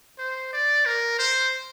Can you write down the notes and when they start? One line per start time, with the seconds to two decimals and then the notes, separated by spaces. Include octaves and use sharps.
0.19 C5
0.53 D5
0.86 A#4
1.19 C5